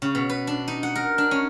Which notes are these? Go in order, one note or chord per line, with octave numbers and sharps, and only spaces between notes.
C#3
B2
B4
D4
D#4
F#5
A#4
D4
C#4